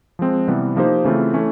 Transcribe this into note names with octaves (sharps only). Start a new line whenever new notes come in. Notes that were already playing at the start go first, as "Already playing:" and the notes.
F3 G#3 C4
C3 E3 G3 B3
F3 A#3 D#4 G4 C5
C#3 E3 A3 C4 F4
E3 A3 C#4